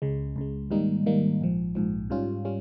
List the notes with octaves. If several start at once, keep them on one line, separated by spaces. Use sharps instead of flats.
C#2 C#3 G#3
C#2 C#3 G#3
G#2 D#3 G3 A#3 D#4
G#2 D#3 G3 A#3 D#4
A#1 G#2 F3
A#1 G#2 F3
G#2 G3 C#4 F4
G3 C#4 F4